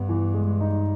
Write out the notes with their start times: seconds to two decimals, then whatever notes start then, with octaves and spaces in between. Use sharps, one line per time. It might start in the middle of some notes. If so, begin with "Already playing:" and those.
Already playing: G2 B3
0.09 E3
0.34 G#3
0.60 D#4